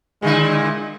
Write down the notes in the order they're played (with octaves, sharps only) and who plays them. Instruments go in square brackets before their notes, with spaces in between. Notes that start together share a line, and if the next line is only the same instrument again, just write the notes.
[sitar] A#2 D3 E4 [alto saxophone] G#3